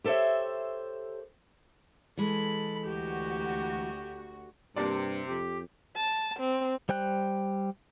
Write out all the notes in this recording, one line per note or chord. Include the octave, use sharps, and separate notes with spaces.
G4 A4 C5 C#5 E5
E3 G#3 A4 B5
D2 F#4 G4
G2 C3 A#3 D4 D5
F2 G4
A5
C4
G3 C5 G5 F#6